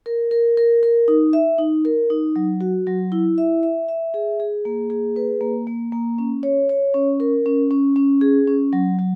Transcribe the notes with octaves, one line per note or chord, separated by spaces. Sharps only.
A#4
A#4
A#4
A#4
D#4
E5
D#4
A#4
D#4
F#3
F#4
F#3
E4
E5
E5
E5
G#4
G#4
A#3
G#4
B4
A#3
A#3
A#3
C#4
C#5
C#5
C#4
A#4
C#4
C#4
C#4
G#4
C#4
F#3
F#3